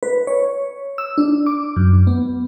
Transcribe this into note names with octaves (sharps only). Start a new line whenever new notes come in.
B4
C#5
E6
D4
D6
F#2
B3